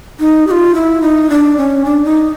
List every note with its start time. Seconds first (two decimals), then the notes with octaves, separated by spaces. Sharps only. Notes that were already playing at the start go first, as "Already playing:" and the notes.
0.20 D#4
0.47 G4
0.51 F4
0.75 E4
1.02 D#4
1.30 D4
1.57 C#4
1.85 D4
2.05 D#4